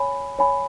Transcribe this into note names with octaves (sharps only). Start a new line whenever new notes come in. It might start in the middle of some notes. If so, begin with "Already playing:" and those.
Already playing: C#5 G#5 B5
C#5 G#5 B5